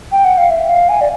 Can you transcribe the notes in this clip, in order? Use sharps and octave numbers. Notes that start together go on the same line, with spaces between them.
G5
F#5
F5
E5
F5
G#5
D5